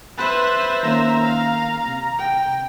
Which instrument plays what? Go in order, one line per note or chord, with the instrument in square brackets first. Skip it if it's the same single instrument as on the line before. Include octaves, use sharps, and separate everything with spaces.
[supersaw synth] B4 F#6 [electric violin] C5 E5 [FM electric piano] A6
[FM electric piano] D#3 A#3 C#4 [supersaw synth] A#5
[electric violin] F5
[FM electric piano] C3
[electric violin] G5